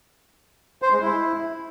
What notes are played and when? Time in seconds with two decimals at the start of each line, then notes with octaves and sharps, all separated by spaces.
0.82 C5
0.92 G#3
1.02 E4